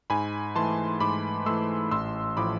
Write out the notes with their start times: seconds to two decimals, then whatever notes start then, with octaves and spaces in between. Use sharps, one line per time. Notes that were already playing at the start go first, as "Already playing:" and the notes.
0.10 G#2 G#5 B5
0.56 E3 A3 A5 C6
1.00 G#2 B5 D6
1.46 E3 A3 C6 E6
1.91 A1 C6 E6
2.37 A2 F3 B5 D6